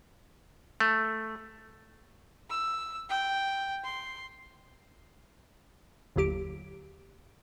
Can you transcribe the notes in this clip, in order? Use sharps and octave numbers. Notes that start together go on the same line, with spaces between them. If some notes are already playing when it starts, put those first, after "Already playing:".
A3
E6
G5
C6
G1 D#2 F#3 G4 D7